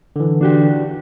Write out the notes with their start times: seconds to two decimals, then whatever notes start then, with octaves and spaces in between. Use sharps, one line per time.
0.16 D3 E3
0.41 D4 F#4 G4